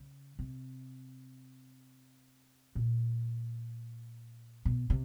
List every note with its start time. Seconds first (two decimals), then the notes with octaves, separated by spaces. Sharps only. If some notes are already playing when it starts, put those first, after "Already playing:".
Already playing: C#3
0.39 C3
2.75 A#2
4.65 B2
4.90 C3